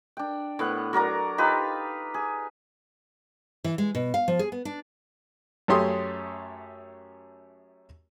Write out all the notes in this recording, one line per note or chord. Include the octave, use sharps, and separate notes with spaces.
D4 G5
A2 B3 F#5
F#3 A#4 D5 A#5
D#4 F4 G4 B4
G#4
E3
G#3
B2
F5
F3
G#4
B3
D4
F#2 A3 C#4 G4 C6 D#6